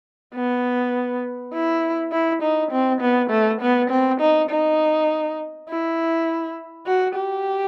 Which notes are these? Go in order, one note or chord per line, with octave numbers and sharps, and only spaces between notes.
B3
E4
E4
D#4
C4
B3
A3
B3
C4
D#4
D#4
E4
F#4
G4